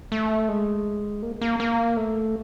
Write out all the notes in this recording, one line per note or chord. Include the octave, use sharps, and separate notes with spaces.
A3
G#3
A#3
A#3
A#3
A3